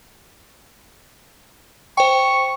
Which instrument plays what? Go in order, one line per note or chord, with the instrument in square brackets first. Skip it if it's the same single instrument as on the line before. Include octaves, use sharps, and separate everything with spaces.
[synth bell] C5 G5 [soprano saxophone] C#6